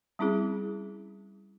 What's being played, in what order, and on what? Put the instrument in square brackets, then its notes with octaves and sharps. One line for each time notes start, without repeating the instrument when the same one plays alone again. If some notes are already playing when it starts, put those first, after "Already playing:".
[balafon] G3 C4 C#4 E4 G#4